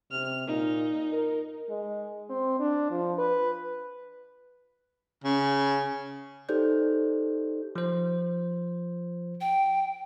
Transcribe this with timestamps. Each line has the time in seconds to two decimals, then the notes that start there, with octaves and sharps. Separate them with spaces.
0.11 C3 F6
0.47 A#2 D#4
1.12 A#4
1.70 G#3
2.30 C4
2.60 D4
2.91 F3
3.19 B4
5.24 C#3
6.49 D#4 G4 A4 C5 D5 G6
7.76 F3 C5
9.41 G5